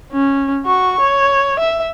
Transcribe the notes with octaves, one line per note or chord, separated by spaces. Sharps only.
C#4
F#4 C#6
C#5
E5